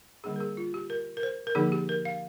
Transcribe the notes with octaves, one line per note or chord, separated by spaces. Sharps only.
D3 G3 A#3 D4 G#4
A#4
G#4
F4
G4
A#4
A#4
C5
A#4
D3 F3 A#3 D#4 G#4
G4
A#4
F5